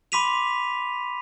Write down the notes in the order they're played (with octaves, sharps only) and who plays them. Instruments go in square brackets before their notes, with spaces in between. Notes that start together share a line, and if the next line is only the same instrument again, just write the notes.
[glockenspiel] B5 C6 D6 B6 D#7 F7